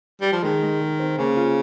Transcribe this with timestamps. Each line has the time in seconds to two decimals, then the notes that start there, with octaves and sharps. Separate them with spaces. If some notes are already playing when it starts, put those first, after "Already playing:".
0.21 G3
0.32 F3
0.42 D#3 G#3
0.62 G#3
0.81 G#3
1.00 C4
1.18 C#3 A#3
1.36 F4